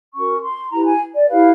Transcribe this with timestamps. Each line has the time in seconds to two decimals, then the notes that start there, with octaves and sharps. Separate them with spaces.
0.13 C#4 F#4 A#4 C#6
0.42 C6
0.71 E4 G4 B4 A#5
0.85 G#5
1.14 D5
1.29 E4 G4 B4 F5